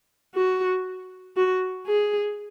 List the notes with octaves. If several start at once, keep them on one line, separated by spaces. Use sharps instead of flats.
F#4
F#4
G#4